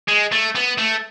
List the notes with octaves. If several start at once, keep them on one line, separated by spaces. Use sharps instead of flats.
G#3
A3
B3
A3